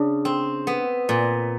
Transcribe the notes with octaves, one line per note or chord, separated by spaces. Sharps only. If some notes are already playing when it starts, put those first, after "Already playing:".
Already playing: C#3 D4
C4
B3
A#2